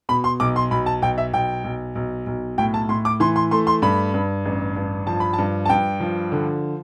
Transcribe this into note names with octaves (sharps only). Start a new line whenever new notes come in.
B2 B5
C6
B1 D6
C6
B1 B5
A5
B1 G5
E5
B1 G5
B1
B1
B1
A2 G5
A5
A2 C6
D6
E3 C6
C6
A3 C6
C6
G2 B5
G2
A1
G2
F3 A5
B5
G2 A5
A5
G2 G5
F3
D3